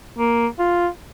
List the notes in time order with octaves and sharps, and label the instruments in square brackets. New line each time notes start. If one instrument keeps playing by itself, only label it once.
[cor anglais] A#3
F4